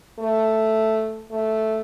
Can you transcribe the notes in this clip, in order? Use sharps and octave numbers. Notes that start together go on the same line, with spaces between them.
A3
A3